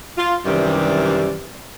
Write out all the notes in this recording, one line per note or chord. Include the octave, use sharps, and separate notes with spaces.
F4
F#2 C3 D#3 E3 G3 D5